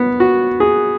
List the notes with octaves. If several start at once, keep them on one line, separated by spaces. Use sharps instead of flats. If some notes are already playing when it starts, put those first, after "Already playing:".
Already playing: B3
F#4
G#4